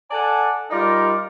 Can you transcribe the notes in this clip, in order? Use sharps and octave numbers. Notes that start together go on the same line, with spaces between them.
A4 D5 F#5 G#5 A5
G3 D#4 F4 A#4 D5